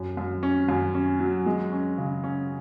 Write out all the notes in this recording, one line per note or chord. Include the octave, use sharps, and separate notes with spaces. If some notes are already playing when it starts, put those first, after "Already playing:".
Already playing: F#2
F#2
C#4
F#2
C#4
F#3
G#3
C#4
C#3
C#4